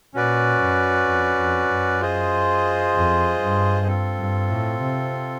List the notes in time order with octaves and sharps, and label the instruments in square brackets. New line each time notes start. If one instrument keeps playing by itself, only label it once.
[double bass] A#2 [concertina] C#4 F#4 B4 D5
[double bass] F#2
F2
F2
F#2
[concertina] F4 G#4 C5 D#5
[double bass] F2
G2
[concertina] C4 F4 A4
[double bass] G2
A2
C3